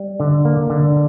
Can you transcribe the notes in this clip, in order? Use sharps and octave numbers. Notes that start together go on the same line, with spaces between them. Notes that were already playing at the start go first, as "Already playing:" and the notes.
Already playing: G3
D3
A#3
D3